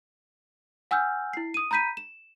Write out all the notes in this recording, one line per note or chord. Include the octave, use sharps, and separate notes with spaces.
F#5 G#5 E6 F6 G6
E4 C7
D#6 D#7
A#5 B5 G6 B6 D#7
E7